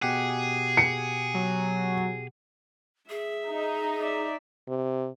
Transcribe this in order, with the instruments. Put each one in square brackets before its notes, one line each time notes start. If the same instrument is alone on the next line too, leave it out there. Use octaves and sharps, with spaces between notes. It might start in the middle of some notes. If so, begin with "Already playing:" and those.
[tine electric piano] B2 G4 F#5 [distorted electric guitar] G#4
[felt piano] C#7
[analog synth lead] F#3
[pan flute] G#4 [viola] E5
[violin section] D#4
[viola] D5 E5
[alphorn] C3